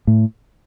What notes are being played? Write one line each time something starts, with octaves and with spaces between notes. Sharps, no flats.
A2